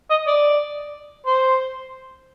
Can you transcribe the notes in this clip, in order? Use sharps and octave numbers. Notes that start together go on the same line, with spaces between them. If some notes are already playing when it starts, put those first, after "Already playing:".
D#5
D5
C5